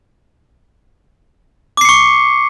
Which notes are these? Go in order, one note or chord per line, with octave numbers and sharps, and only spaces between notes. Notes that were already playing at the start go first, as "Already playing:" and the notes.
C#6 D6 C7 C#7